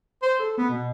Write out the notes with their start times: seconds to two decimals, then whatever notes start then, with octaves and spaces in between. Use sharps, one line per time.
0.23 C5
0.39 A4
0.58 B3
0.70 B2